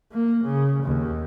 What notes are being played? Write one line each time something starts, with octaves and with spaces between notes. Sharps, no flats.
A#3
C#3
D#2